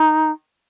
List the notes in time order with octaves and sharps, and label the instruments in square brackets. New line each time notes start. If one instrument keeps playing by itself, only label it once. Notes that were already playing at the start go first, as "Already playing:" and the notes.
Already playing: [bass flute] D#4